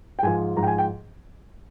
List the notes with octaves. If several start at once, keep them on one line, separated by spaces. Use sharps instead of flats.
G5
G#2 F3 G#5
G#2 F3 A#5
G5
G#5
G5